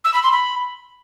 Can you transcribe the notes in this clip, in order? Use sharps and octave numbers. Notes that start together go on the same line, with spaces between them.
E6
B5
C6
B5